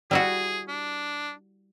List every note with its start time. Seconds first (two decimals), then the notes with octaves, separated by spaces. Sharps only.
0.11 G3 E4 F#4 G#4
0.68 D4